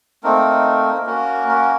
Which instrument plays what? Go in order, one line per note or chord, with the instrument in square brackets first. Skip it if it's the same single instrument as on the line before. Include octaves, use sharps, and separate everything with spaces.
[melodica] A3 A#3 C4 D#4 A#4
A#3 C#4 F#4 A#4
A#3 A#4